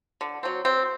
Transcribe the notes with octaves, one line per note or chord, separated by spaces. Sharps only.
D3
F#3 C4
C4